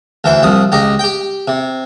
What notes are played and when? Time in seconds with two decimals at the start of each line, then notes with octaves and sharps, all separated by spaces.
0.24 D2 E3 C5
0.43 C2 F3 D#6
0.72 C#2 G4 D#5
0.99 G4 G5
1.48 C3